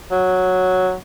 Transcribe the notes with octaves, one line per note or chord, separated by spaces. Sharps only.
F#3